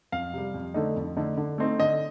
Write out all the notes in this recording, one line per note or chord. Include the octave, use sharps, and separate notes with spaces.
F2 F5
C3 G3
F2
D3 A3 D#4
F2
D3 A3 D#4
D3
A3 C4 D#4
D3 D#5